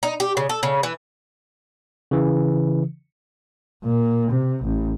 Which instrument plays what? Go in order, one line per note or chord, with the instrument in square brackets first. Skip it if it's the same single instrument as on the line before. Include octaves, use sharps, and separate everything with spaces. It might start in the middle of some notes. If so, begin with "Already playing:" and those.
[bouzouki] D#4
G4
C#3
A4
C#3
E3
[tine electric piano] C#3 E3
[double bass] A#2
C3
A1